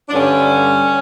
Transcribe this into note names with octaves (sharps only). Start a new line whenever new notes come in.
D4
G2 D3 G3 C#4